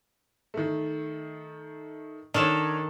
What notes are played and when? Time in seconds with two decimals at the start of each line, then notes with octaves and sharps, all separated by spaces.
0.54 D#3 A3
2.34 D#3 D4 D#4 A4 C#5